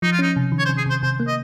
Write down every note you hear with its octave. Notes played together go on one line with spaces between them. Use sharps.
F3 D#4
F4
C#4 D#4
C3
D#3
C#5
C5
C3
G#4
C3 C5
C3 C5
A#3
D#5